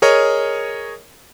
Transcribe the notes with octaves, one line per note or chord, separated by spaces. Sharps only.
G#4 A#4 C#5 D#5